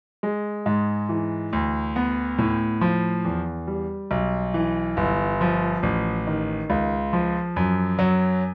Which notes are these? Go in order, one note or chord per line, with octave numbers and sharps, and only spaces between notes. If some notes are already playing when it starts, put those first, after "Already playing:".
G#3
G#2
E3
D2
B3
A2
F3
E2
G3
B1
E3
G1
F3
A1
D#3
C#2
F3
F#2
F#3